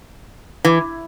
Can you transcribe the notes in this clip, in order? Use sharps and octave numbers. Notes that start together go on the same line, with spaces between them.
E3